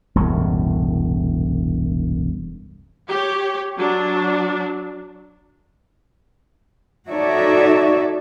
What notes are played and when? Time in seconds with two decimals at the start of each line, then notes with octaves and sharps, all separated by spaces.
0.15 E1 C2 F#2 A2
3.08 G4 C#5
3.77 F#3 D4
7.10 D#4 F#4 A4 C#5 D5 E5